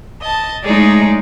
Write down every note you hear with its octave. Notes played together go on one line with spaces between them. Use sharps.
D#5 A5
G#3 A3 D#4 G#4 C#5 D5